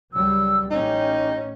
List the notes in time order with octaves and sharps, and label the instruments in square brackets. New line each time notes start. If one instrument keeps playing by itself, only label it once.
[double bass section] C#2 F#3 G3 [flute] E6
[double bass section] A1 C#4 [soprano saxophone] D#4 [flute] G4